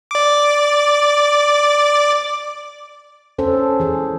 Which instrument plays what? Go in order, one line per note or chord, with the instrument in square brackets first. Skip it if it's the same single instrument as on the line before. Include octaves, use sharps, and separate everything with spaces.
[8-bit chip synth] D5 D6
[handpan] C#4 A4 C5
E3 G#4